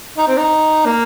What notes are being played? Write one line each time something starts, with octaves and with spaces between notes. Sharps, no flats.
D#4
C4
D#4
A#3